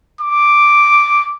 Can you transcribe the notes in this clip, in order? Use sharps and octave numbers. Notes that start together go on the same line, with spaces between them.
D6